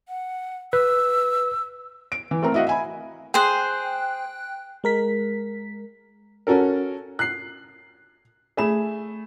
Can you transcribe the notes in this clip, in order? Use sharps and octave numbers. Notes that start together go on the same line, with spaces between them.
F#5
B4 E6
D7
E3
A3 C4 A#4
E4 F#4 D#5 F5 F#5
E5 G#5 B5
G#4 C5 G5 F#6
G#3 A#4 B6
C#4 F#4 A4 A#4
F#6 C7
A3 G#4 B5 E7